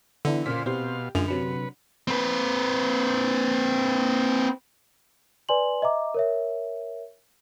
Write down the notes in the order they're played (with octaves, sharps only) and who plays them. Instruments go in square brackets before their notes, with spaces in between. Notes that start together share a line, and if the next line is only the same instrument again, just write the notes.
[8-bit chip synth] D3 [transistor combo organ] E3 [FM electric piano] B3 D4 E4
[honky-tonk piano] A#2 C#3 [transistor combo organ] F4 C5 [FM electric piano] C6 F6 B6
[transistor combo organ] B2 F5 [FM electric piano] C4 C6 [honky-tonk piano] G4
[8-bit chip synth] F#2 [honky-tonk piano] D3 F7 [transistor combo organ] G#3 [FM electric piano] F4
[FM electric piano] C3 F#3 C#7 [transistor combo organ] B4
[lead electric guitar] C4 B4
[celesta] B4 D5 G#5 C6 F#7
D#5 E5 A#5 D6
A#4 C#5 E5